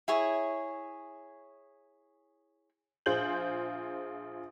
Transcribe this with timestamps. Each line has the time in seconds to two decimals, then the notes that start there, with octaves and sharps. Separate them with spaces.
0.08 E4 G#4 C#5
3.06 A#1 F4 G#4 C5 G6 F#7